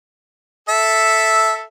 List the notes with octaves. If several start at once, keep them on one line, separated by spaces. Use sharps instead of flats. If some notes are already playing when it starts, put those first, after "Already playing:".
A4 E5